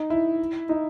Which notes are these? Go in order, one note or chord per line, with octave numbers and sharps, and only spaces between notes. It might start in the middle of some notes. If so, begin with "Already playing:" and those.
Already playing: D#4
E4
D#4